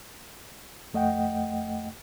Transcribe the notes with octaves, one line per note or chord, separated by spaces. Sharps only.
F2 A3 D#5 F#5 G5